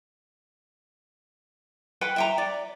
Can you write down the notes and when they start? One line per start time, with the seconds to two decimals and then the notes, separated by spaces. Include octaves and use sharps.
2.01 B4 F#5 G5
2.16 E5 G5 A#5
2.38 D5